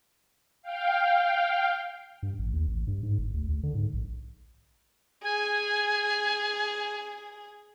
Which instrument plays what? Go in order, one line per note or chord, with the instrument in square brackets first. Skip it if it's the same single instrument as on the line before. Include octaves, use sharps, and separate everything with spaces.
[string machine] F5 G5
[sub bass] G2
A1
D#2
A1
G2
G#2
G1
D2
D2
D3
G#2
A#1
[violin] G#4 [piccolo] G#5